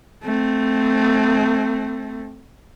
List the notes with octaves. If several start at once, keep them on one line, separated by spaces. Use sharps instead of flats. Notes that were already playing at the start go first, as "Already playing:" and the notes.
A3 C4